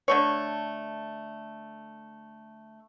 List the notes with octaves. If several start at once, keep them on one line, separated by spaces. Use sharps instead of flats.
D3 A3 C#5